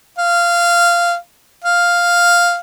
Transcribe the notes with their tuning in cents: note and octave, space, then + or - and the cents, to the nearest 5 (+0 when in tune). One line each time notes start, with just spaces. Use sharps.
F5 -15
F5 +0